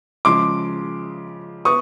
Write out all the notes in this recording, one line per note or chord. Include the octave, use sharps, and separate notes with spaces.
C#3 F3 G#3 C6 D6
B3 C#6 D#6